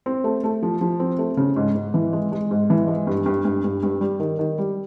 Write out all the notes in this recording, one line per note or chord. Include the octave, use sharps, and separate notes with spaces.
C4
A3
A3
F3
F3
C4
A3
C#3
G#2
G#2
E3
G#3
G#3
G#2
E3
G#3
G2
G2
G2
G2
G2
G3
D#3
D#3
G3